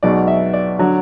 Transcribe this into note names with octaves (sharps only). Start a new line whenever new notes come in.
B1 B2 G#3 D5
E5
D5
D3 F#3